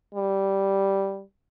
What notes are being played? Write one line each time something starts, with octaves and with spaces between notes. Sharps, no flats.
G3